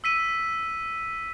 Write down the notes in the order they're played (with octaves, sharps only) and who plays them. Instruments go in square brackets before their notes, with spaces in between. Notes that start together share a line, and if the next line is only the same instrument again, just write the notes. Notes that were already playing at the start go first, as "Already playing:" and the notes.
[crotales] E6 B6 D#7